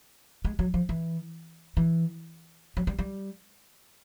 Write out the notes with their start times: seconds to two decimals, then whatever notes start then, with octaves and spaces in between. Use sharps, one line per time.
0.45 G#3
0.59 F#3
0.74 F3
0.89 E3
1.77 E3
2.77 F#3
2.87 G3
2.99 G3